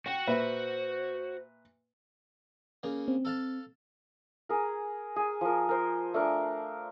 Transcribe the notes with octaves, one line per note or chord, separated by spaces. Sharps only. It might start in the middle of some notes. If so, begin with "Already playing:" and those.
F#4 F#5 G5
A#2 B4 C5 E5
C#3 A#3
C4
A4 F5 A5
G#4 A#4
G#4
F3 A#4
A#4 C5
A3 D4 A#4